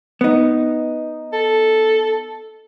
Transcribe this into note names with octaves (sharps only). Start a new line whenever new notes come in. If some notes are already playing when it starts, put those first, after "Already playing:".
B3 D#4
A4